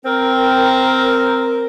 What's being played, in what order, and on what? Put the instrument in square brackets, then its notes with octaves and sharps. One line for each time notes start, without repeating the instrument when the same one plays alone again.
[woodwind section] C4 A#4